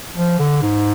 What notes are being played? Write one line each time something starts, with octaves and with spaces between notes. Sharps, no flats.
F3
D3
G#2